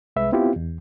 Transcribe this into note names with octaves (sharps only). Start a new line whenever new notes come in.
C2 G#3 B4 E5
B3 C4 E4 F4 G4
E2